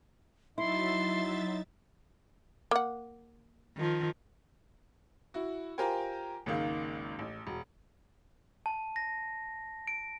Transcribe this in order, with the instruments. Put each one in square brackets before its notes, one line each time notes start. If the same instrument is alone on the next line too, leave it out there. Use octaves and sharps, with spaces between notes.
[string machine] F#3 E5 A6 [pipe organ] D#4 [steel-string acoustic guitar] E4 [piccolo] C6
[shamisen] A#3 F#5
[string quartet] D#3 F3
[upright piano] E4 F#4
F4 G4 A#4 C5 G5 G#5
G#1 C#2 D#3 A#3
A1
E1
[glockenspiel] A5
A#6
D7